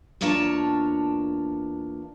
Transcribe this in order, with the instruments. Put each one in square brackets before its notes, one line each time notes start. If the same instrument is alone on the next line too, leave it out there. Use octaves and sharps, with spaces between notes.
[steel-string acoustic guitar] E2 A#3 D4 F4 C#5 A5